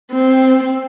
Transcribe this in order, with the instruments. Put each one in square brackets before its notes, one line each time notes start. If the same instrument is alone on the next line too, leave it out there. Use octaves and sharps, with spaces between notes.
[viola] C4